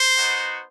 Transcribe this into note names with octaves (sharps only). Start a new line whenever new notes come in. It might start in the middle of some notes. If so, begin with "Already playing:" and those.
Already playing: C5
B3 D#4 F#4